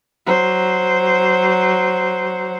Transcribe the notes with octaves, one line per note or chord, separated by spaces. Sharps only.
F#3 C5